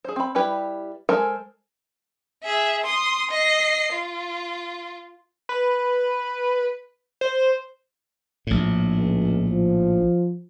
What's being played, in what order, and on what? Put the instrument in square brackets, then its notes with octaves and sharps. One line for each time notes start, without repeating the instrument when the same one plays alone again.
[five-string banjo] G#4 C5
C4 B5
G3 E4 G4 B4
G#3 A4 A#4 C5 G#5
[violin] G#4 E5
C6 D#6
D#5 C7
F4
[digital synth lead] B4
C5
[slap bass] A#1 A2
[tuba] C#2
F3